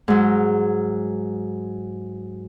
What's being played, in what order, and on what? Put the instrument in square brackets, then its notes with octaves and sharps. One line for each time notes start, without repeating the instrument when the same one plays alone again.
[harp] G#2 F#3